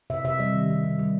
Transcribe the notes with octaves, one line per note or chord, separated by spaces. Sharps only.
C3 E5
C3 E5
G3 D#5
D#3
C3
C3
G3